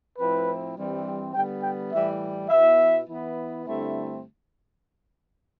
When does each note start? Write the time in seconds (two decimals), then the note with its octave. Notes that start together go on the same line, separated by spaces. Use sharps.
0.19 A2 F3 C4 E4 B4
0.76 G2 E3 G3 C4
1.34 D3 G3 B3 G5
1.63 G5
1.92 A2 E3 G3 E5
2.49 B2 B3 E4 E5
3.07 E3 B3 E4
3.66 G2 D3 A3 C4 E4